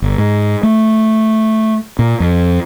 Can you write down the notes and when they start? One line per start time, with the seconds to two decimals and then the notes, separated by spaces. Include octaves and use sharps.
0.02 G1
0.18 G#2
0.63 A3
1.99 A#2
2.20 F2